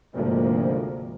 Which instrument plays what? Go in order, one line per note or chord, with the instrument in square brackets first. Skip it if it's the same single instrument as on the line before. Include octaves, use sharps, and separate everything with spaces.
[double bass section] G#1 D2 G#2 C3 F3 A#3